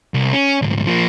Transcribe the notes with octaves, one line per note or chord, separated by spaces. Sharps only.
C2
C#4
D2 G#2
F3 A#3